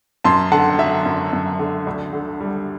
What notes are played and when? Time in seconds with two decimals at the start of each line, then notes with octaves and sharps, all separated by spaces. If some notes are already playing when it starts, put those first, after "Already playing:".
0.24 F#2 A5 C6
0.52 D3 F#5 A5
0.78 F#3 E5
1.06 F#2
1.33 F#2
1.59 D3
1.87 D2
2.13 D3
2.41 G3